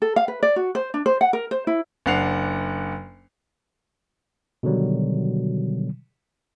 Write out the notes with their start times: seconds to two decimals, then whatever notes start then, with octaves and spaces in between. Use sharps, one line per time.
0.02 A4
0.16 F5
0.28 B4
0.43 D5
0.56 F#4
0.75 C5
0.94 D4
1.06 C5
1.21 F#5
1.33 A#4
1.51 C5
1.67 E4
2.06 F#1 D4 F#5 C7 F7
4.63 B2 D3 D#3 F#3 G3